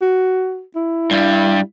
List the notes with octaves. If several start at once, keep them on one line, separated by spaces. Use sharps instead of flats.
F#4
E4
G2 G3